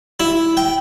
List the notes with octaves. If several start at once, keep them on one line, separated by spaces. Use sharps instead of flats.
E4
G5